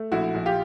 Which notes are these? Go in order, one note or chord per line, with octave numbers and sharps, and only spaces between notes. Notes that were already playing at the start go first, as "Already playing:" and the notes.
Already playing: A3
A#1 E4 F#4
A#1
F4 G4